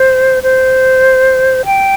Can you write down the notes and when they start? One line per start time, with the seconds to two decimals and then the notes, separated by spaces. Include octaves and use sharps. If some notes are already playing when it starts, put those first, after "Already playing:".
Already playing: C5
0.43 C5
1.65 G5